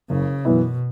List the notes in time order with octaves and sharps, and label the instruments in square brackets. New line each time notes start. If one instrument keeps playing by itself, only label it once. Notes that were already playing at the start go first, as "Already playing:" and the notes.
[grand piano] F#1 [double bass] C#3
[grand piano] F#2 E3 B3 E4 [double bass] B2